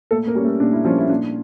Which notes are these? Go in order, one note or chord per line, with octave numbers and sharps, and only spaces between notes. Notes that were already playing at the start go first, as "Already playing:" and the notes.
A#2 A3 A4
A#3 A#4
G3 C#4
A3 A4
A#2 D4
E4
F3 G3 C#4 F4
E4
A#2 D4